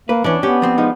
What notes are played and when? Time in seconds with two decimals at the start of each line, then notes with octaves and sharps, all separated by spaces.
0.09 A#3 B4
0.24 E2 E3 C#4 D4
0.43 B3 C#4 G4
0.62 F3 C4
0.78 F3 G#3 D#4